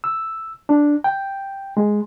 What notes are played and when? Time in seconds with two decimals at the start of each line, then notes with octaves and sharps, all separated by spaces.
0.04 E6
0.69 D4
1.04 G5
1.77 G#3